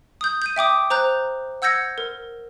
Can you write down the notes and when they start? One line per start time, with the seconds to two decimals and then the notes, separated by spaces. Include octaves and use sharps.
0.21 D#6 G6
0.42 G6 D#7
0.56 E5 G5 D6 D#6
0.90 C5 A#5 F#6 G6
1.62 F#5 E6 G6 G#6 A#6 C#7
1.98 A#4